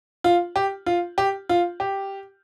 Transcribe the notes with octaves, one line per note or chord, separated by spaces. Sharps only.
F4
G4
F4
G4
F4
G4